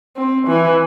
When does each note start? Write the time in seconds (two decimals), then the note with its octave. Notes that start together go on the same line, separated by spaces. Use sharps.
0.17 C4
0.48 E3